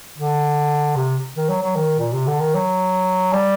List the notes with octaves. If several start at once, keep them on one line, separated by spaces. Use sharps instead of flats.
D3
C3
D#3
F#3
F#3
D#3
A#2
C3
D3
D#3
F#3
G3